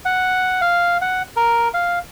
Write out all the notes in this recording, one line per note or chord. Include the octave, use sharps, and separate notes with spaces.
F#5
F5
F#5
A#4
F5